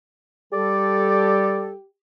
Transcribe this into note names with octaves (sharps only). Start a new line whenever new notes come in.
G3 G4 A4 D5